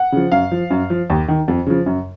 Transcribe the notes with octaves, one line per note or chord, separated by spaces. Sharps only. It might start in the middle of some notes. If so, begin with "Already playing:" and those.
Already playing: F#5
C#3 F3
F#2 F5
F3
F#2
F3
D#2
D#3
F2
C#3 F3
F#2